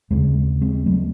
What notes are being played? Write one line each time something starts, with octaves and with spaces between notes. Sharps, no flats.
D#2 C#3 G#3 C4
G#3 C4
F#3 A3